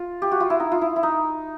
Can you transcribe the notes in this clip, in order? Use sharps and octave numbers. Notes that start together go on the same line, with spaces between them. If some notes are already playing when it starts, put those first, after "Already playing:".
Already playing: F4
G4
F#4
F4
E4
D#4
F4
E4
E4
D#4